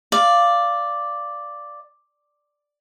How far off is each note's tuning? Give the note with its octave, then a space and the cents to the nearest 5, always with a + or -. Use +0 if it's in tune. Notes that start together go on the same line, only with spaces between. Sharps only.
D5 +0 F5 -10